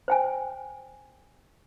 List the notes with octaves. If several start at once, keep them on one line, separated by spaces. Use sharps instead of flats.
C5 G5 G#5